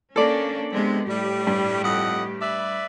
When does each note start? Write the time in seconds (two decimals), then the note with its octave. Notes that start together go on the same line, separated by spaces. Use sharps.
0.16 A#3 C#4 D4 A4 D5
0.73 C3 G#3 B3 C4 D4
1.08 A2 G3 G4
1.47 G2
1.83 F2 D#5 F#5
2.42 B4 D5 E5